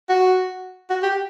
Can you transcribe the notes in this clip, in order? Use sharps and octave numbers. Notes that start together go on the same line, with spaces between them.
F#4
F#4
G4